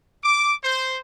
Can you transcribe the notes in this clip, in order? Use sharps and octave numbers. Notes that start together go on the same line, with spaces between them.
D6
C5